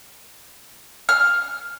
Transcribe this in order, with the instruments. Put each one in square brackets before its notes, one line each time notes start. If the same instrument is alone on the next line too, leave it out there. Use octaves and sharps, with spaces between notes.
[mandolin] F6